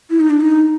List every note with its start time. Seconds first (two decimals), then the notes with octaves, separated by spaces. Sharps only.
0.10 E4
0.20 D#4
0.30 D4
0.40 D#4